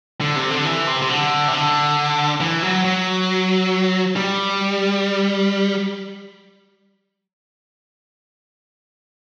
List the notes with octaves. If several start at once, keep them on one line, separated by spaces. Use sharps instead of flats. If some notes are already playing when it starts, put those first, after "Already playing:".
D3
C3
D3
E3
C3
C3
D3
C3
D3
E3
F#3
F#3
G3